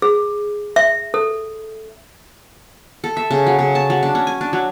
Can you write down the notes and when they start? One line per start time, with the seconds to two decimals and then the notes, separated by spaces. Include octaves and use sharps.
0.02 G#4
0.76 E5
1.14 A4
3.04 A4
3.17 E5
3.31 C#3
3.47 F#3
3.59 C#3
3.75 A5
3.90 F#3
4.03 D4
4.15 C#4
4.27 G#5
4.41 D4
4.53 F#3